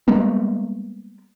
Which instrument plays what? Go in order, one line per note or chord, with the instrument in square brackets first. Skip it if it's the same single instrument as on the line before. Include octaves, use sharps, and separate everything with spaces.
[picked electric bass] G3 G#3 A#3 B3